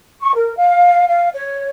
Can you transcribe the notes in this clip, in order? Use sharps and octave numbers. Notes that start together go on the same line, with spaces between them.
C#6
A#4
F5
F5
C#5